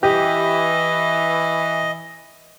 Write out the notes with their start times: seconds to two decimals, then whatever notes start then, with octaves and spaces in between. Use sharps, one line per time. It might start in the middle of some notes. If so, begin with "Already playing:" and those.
0.03 E3 G4 D#5